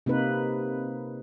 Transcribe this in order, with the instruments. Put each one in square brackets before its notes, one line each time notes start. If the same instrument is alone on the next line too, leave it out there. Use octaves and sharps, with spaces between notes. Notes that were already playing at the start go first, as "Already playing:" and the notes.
[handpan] C3 A#3 D#4 B4